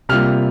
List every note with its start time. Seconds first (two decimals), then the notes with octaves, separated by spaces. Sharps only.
0.09 C3 G3 A#3 F4 F6